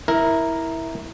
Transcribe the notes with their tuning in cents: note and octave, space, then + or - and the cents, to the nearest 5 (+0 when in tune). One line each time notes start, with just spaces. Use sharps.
E4 -10 A#4 +0